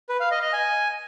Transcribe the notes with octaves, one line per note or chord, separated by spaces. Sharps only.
B4
F5
D#5
D#5
G#5